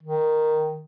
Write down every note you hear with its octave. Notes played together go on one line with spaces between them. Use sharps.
D#3